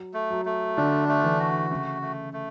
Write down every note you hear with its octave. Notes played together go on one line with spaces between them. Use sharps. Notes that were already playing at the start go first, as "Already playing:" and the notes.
Already playing: F#3
A3
F#3
A3
D3 D4
A3
E3
F#4
C#3 A3
A3
A3